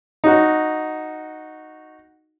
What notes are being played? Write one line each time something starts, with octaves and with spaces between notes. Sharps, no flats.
D#4 F#4